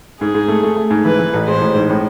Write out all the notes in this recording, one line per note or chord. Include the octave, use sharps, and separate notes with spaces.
G#2 G#4
G#2
A3
A3
A3
G#2
E3 B4
E3
A1
G#3 C5
A1
G#2
A2